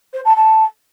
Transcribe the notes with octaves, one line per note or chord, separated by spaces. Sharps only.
C5
A5
A5